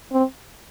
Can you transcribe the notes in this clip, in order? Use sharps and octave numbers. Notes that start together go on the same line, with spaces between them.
C4